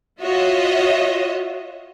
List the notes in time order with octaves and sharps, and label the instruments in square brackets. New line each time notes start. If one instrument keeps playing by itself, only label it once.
[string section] F4 F#4 C#5 D#5 E5